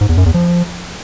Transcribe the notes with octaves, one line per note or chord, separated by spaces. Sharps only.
G#2
E2
F#2
E2
F3